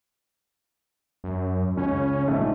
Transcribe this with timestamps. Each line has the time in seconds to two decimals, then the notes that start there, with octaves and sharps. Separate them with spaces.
1.24 F#2
1.77 C#2 C#4
2.28 A#1 G#2 A3